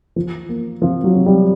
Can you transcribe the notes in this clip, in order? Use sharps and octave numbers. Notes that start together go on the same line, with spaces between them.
F3
A#3
C3 F3 F4
F#3 F#4
C3
G3 G4